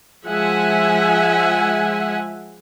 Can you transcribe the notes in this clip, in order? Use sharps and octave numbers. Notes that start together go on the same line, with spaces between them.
F3 G#3 E5 F#5 G#5